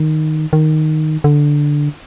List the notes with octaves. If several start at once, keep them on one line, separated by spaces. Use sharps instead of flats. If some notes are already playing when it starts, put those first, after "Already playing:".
Already playing: D#3
D#3
D3